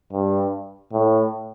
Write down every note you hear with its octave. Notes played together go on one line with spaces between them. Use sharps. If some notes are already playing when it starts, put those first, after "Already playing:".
G2
A2